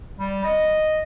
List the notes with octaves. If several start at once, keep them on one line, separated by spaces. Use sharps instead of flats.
G3
D#5